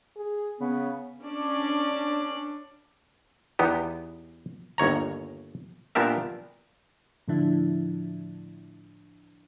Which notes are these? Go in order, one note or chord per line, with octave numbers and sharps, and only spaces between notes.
G#4
C#3 B3
C#4 D4 D5
E2 B3 D#4 G4
G1 D#2 C#5 A#5
A#2 B3 D4 G4 A#4 E5
A2 D3 F3 D4 E4